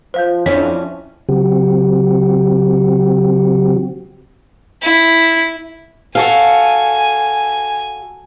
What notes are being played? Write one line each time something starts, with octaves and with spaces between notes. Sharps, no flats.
F3 C5 F5 G6
F2 C#4 D4 E4 B6
C#3 F#3 C4 F#4 G4
E4
F#4 A4 F5 G#5